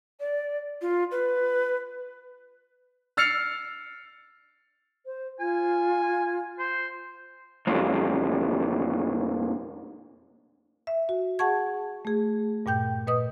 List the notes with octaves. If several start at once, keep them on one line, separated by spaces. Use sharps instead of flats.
D5
F4
B4
E6 F6 A6 C7 C#7 F7
C5
F4 G#5
C5
B1 F2
E5
F#4
G#4 F#5 A5 C#6 G#6
A3 G#4
G2 A#2 G5 G6
A#2 B4 D#5 D#6